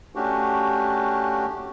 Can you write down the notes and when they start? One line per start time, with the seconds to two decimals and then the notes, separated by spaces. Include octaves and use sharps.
0.15 A3 C#4 D4 F#4 G4